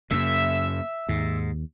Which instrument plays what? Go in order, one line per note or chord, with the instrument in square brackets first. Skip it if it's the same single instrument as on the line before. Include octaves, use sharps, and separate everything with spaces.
[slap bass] F#2 C#3 [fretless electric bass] A#3 [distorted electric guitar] E5
[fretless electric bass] D#2 [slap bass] G#2